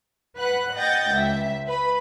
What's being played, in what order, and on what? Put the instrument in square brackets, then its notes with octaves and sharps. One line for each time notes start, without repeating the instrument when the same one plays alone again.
[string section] B4 F#5 F#6
D#5 F#5 G5 G6 A6 A#6
C#2 E5
B4 B5